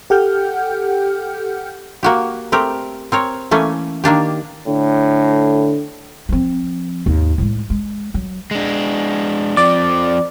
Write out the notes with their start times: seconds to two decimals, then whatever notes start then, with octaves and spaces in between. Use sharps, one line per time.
0.10 G4 A4 F#5 G5 F6 G6
2.03 A#3 F#4 G4
2.52 A3 C4 G4 A#4
3.12 C4 A#4 C#5
3.51 E3 A3 A#3 C#4
4.04 D#3 A#3 D4 G4
4.67 A2 D3
6.29 F3 C4
7.06 D#2 G#2
7.38 A2 G#3
7.70 G#3
8.14 F#3
8.51 G#3 D4
9.57 F3 C4 D5